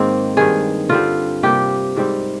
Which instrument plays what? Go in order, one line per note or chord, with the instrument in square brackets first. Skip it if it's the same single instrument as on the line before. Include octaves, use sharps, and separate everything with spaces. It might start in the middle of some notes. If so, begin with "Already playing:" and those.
Already playing: [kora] G#2 D#3 A#3 C4
G2 D#3 G#3 G#4
D3 G3 C4 F4
C3 G3 A#3 G4
G#2 G3 C4